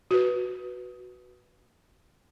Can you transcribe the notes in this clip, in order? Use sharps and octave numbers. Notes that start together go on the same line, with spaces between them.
F#4 B4